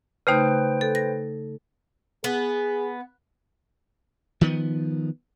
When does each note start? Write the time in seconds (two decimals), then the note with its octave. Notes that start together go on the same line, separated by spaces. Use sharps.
0.27 C#3 A3 D#4 B4 C5 G5
0.81 A4
0.95 A#6
2.24 B3 G#4
4.41 D#3 F3 B3